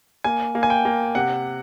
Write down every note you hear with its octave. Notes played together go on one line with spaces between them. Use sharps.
A#3 G#5
A#3
G#5
G5
A#3
C3 F#5